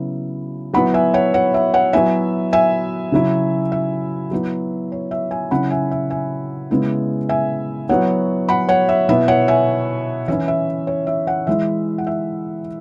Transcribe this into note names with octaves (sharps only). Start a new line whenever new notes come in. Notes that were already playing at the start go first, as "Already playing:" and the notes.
Already playing: C#3 F#3 B3 E4
F#3 B3 E4 F#5 B5
E5 G#5
C#5 F#5
C#5 F#5
E5
C#5 F#5
F#3 B3 E4 E5 G#5
E5 G#5
C#3 F#3 E4
E5
F#3 B3 E4
C#5
E5
E5 G#5
C#3 F#3 C#4 E4 F#5 B5
E5 G#5
E5
E5 G#5
C#3 G#3 B3 E4
E5 G#5
F#3 B3 E4 C#5 F#5
F#5 B5
C#5 F#5
E5
B2 B3 E4 E5
C#5 F#5
E5 G#5
E3 C#4 E4 E5
E5
C#5
E5
C#5 F#5
E3 G#3 E4 E5
F#5
E5